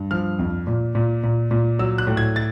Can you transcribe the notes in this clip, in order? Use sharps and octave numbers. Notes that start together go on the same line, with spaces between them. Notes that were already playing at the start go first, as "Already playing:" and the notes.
Already playing: G2
F3 F6
F2
A#2
A#2
A#2
A#2
F#3 E6
F#6
A2
G#6
A6